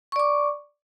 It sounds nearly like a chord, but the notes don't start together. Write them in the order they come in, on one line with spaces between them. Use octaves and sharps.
C#6 D5 D6